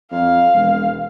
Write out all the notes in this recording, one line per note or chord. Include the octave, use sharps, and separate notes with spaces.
F2 F5
E1